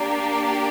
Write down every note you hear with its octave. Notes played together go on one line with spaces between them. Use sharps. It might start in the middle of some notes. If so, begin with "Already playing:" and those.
Already playing: A#3 D4 G4